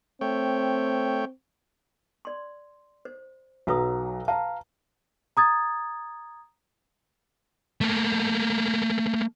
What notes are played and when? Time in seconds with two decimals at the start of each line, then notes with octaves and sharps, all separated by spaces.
0.21 A3 C4 C#5 G5
2.25 D5 C6
3.05 C5
3.67 B1 F#3 F#4 B4 A#5 D#6
4.28 F5 A5 A#5
5.37 A#5 D#6 G#6 A6
7.81 A3 A#3